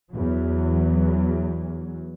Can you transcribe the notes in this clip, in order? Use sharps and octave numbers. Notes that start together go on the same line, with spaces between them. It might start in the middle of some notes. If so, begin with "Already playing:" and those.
E2 F#3